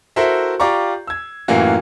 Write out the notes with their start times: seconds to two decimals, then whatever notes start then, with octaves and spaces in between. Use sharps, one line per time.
0.16 E4 F#4 A4 A#4 C5 E5
0.60 F4 G4 D5 A#5 C#6
1.07 E6 G#6
1.48 F#2 A2 E3 A#3 F4 F#4